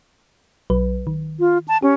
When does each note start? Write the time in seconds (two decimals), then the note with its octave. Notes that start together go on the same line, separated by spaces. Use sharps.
0.70 B1 F#3 B4
1.07 D#3
1.40 F4
1.68 A5
1.82 C#4 G4